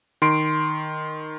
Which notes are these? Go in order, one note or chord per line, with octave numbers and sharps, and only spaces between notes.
D#3 C6 D7